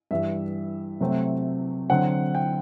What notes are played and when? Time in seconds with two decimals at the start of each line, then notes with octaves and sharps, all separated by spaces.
0.11 G2 E3 G3 E5
1.01 C3 F#3 A3 C4
1.90 D3 F#3 C4 F#5
2.35 G5